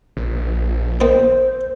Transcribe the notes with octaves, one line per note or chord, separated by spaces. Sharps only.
A#1
A#3 C4 D#4 C5